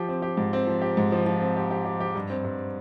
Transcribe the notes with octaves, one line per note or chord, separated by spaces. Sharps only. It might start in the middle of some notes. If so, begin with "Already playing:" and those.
Already playing: F3 G4
C4
G4
G#2
C4
F3
G4
G#2
F3
F3
C4
G4
G4
G4
G4
G2
C4
G2